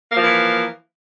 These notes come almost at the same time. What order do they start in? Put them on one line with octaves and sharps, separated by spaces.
A#3 F3 E3